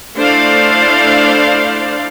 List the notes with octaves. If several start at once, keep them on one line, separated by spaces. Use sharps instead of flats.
A3 D4 E4 C5 D5 F5